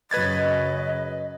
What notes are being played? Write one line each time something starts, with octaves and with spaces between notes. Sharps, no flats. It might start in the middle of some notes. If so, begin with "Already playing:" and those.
F#2 C#3 F#3 B4 D#5 G#6 A6